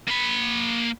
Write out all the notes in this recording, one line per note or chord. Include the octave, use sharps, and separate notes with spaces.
A#3 B5